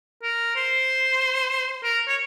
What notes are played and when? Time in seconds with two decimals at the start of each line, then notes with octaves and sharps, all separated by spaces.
0.22 A#4
0.56 C5
1.83 A#4
2.08 C#5